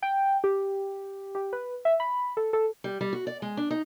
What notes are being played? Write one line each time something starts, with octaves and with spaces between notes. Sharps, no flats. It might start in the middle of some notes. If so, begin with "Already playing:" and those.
G5
G4
G4
B4
E5
B5
A4
A4
G3
G3
F#4
D5
G#3
D4
D#4